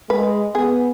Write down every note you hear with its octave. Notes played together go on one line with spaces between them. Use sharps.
G#3 B4
B3 G#4